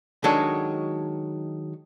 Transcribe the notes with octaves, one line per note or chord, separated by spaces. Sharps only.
D#3 F#3 G#3 D4 F#4 A4